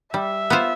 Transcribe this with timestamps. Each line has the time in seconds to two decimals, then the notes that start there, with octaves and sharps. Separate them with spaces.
0.14 G3 E5
0.50 B3 F4 C5